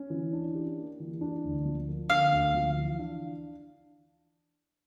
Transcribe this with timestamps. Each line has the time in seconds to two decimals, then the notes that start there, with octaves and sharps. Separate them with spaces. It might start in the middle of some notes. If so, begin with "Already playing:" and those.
Already playing: C#4
0.10 E3
0.33 D4
0.55 G4
0.77 A#3
1.00 E3
1.21 D4
1.44 D2
1.65 F3
1.88 A#3
2.10 D3 F5
2.32 D2
2.54 F3
2.77 E3
2.99 D4